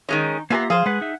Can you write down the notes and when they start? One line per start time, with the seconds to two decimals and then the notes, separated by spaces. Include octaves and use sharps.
0.09 D#3 G#3 C#4 D#4
0.50 A#3 B3 F4 G4 E5 G#5 A#5
0.70 F3 G#4 C5 F5
0.86 G#3 B4 F#5
1.01 D#4 E5